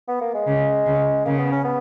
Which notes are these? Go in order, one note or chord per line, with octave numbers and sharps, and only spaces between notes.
B3
A#3
G#3
C#3
C#3
C#3 A#3
B3
C#4
B3